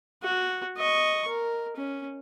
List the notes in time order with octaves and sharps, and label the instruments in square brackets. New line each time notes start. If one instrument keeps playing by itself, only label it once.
[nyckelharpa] F#4
D#5 C#6
A#4
C#4